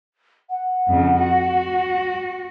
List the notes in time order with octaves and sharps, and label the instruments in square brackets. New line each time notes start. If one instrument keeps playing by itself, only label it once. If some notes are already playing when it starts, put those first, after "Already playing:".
[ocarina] F#5
[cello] F2 C#3
F#4